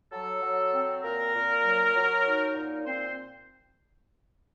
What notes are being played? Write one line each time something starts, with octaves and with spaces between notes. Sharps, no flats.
F#3 A4
F#3
C4
A#2 A#4
A#2
F#3
F#3
D#4
A#2
C4 C5